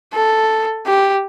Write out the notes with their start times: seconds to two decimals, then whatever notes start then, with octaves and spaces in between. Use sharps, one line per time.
0.14 A4
0.87 G4